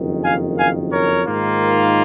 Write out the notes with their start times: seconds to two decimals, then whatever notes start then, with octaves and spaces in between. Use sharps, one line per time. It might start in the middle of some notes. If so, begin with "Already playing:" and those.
Already playing: F#1 F2 D#3
0.24 F5 G#5
0.58 F5 G#5
0.93 A#4 C#5
1.27 G#2 D#3 A#3 F4